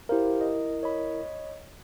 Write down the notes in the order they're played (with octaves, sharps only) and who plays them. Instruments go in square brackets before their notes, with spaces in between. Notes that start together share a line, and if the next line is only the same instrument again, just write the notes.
[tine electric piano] E4 A#4 [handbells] G4 C5 F5
[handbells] D#5
C#5 D#5 B5